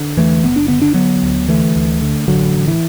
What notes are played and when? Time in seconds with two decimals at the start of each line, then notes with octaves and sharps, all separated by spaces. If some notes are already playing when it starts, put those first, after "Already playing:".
Already playing: D3
0.17 E2 E3 A3
0.43 F#1 B3
0.56 D4
0.68 D3 B3
0.82 D4
0.94 D3 F#3 B3
1.23 D2
1.49 D3 E3 A3
1.76 D2
2.02 D3
2.28 A1 D3 F#3
2.54 A1
2.68 E3